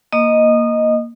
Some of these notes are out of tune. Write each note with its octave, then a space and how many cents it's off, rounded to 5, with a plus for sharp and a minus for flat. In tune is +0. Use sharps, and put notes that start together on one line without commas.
A#3 +0 D#5 +0 D#6 -25